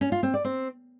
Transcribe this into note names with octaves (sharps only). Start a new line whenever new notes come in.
C#4
F4
C4
D5
C4